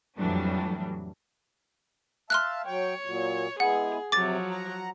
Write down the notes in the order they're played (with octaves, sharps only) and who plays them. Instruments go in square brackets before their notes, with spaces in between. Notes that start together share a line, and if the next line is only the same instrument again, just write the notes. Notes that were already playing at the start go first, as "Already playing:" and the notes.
[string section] F2 A2 E3 F#3 G3 D4
[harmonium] E5 F5 A5 [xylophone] C6 F6 F#6
[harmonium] F#3 G5 [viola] C#5
[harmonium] A#2 F#3
[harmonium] G#3 B3 E4 [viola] G#4 [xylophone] F#5
[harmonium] C3 [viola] F3 F#3 [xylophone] D6 A6
[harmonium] F#5 A#5